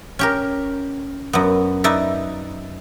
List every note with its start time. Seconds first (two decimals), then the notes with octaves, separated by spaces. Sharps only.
0.19 C#4 G4 A#4
1.33 F#2 B3
1.84 D#4 B4 D5 E5